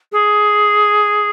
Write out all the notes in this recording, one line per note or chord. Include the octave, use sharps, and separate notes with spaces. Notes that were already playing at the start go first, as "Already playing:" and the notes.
G#4